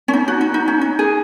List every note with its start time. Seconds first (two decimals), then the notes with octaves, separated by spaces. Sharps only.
0.08 C#4
0.13 D#4
0.28 F#4
0.41 D#4
0.54 D#4
0.68 C#4
0.81 D#4
0.99 G#4